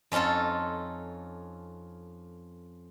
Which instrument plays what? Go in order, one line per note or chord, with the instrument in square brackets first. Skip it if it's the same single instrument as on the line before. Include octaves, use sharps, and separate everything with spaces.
[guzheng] F2 C#4 D#4 F4 A4